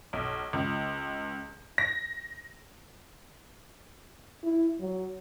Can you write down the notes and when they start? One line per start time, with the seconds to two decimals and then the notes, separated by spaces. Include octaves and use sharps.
0.13 B1
0.53 C#2
1.78 A#6
4.43 E4
4.80 F#3